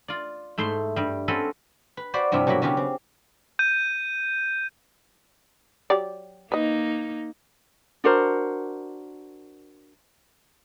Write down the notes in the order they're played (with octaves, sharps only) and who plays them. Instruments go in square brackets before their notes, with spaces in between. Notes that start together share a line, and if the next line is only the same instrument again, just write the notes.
[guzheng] F4 D5
G#2 A3 E4 C5 C6
G2 G3
C4 C#4 F#4 A4 B4
B4
F#4 C5 D5 B5 C6
G2 C3 F3 E4 F4
B2 F#3 A#3 B5
C#3 F#3 B3 F4 G4 G#4
C4
[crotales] G6 D#7
[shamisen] F#3 G4 D5
[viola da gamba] A#3 D#4 [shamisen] B4 D#5
[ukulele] D4 F#4 A#4 C5